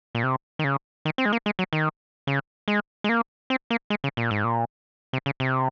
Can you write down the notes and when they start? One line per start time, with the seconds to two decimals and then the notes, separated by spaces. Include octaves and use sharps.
0.15 A#2
0.24 C3
0.59 D#3
0.64 C#3
1.05 D#3
1.18 C4
1.26 G#3
1.33 A#3
1.46 G#3
1.59 F#3
1.73 D#3
2.27 C#3
2.68 G#3
3.04 G#3
3.09 A#3
3.50 C4
3.70 A#3
3.90 G#3
4.04 C#3
4.17 A#2
4.31 G#2
4.44 A#2
5.13 C3
5.26 C#3
5.40 C3